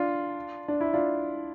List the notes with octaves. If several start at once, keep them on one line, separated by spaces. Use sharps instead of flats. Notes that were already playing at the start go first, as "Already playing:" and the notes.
Already playing: D4 F4
D4
E4
D4 F4